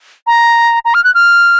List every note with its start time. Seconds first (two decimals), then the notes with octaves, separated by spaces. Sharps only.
0.27 A#5
0.85 A#5
0.94 F6
1.04 F#6
1.14 F6